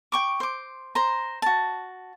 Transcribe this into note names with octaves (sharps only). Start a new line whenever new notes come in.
G5 C#6 D6
C5 D6
C5 A#5
F#4 A5